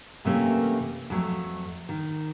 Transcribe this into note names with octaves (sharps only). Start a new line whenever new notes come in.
F#2 C3 E3 A3 A#3 C#4
F2 F#3 A3
D#3